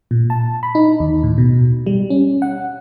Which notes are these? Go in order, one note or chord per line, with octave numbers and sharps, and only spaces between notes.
A#2
A5
B5
D#4
D#2
A2
B2
G3
C#4
F#5